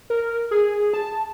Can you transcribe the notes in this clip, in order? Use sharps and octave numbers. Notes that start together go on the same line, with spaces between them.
A#4
G#4
A5